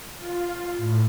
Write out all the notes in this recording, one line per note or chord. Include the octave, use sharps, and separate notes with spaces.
F4
A2